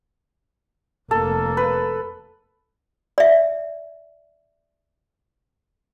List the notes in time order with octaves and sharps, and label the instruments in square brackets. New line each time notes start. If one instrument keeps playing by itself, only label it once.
[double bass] F1 A#3 [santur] A4
[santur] B4
[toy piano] D5 E5